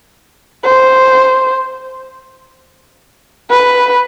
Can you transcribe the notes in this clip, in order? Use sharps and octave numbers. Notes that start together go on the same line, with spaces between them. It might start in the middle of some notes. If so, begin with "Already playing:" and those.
C5
B4